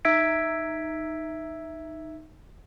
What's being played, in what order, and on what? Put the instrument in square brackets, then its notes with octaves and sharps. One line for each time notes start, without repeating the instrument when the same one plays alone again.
[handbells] D#4 E5 E6 G#6 B6 D7